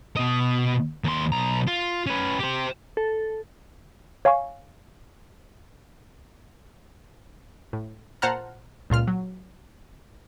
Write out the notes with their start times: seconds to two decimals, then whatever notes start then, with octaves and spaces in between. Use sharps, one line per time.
0.16 B2 D#5
1.04 D#2 C6
1.32 B1 A#5
1.67 F4
2.06 C#4 B4
2.39 G4 C5
2.97 A4
4.25 C#5 F5 G#5 C#6
7.73 A2
8.22 A#2 C5 F#5 A5 A#5 F6
8.90 C#2 A#2 F4 F6
9.08 F#3